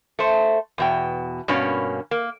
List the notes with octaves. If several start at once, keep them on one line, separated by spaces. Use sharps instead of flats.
A3 C5
E2 B2 G5
G2 B2 A#3 C#4
A#3